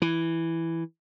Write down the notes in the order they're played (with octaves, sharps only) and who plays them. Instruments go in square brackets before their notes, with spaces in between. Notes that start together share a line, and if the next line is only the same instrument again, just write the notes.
[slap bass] E3